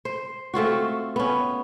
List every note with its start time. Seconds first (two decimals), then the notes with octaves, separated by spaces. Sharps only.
0.05 C5
0.54 A3 C4 F4 F#4
1.16 B3 C#4